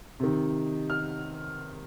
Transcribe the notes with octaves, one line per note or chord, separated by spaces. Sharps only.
C3 D#3
F6